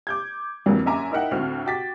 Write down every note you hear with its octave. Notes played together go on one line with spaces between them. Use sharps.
D6 G6 G#6
F2 D3 E3 F#3 A#3
A#1 F#2 E5 G#5 A#5 D6
D#4 E4 A#4 E5 F#5 G5
D2 A2 C4 F#4 F6
F#4 G5 D6 A6 B6